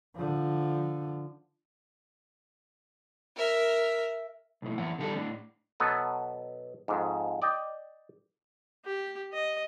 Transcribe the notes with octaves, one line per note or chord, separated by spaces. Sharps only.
D3 F3
A#4 E5
B1 A2
F#2 E3 F#5
D3 D#3 G3 A4
A2 D4
B2 F#3 B3 A4 B4
F2 G#2
D5 D#5 G5
G4
D#5